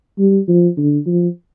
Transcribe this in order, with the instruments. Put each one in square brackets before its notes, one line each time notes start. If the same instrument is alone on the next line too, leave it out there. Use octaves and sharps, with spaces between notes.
[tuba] G3
F3
D3
F3